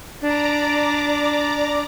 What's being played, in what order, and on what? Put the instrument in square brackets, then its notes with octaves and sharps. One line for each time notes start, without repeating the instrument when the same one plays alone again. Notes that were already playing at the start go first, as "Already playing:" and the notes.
[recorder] D4 [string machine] D5 A#5 D6